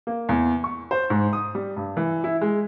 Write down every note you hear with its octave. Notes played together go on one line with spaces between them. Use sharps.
A#3
E2
C#6
C5
G#2
D#6
G3
G2
E3
E4
G#3